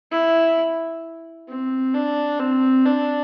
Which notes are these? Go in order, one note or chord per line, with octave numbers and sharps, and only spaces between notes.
E4
C4
D4
C4
D4